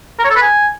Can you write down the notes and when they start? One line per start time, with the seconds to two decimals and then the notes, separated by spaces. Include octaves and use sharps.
0.19 A#4
0.25 C#5
0.30 A4
0.36 B4
0.42 G#5